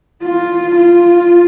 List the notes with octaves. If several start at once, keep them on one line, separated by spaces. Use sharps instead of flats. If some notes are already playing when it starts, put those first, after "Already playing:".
F4
F4